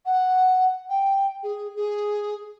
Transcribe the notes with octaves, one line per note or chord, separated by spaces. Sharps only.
F#5
G5
G#4
G#4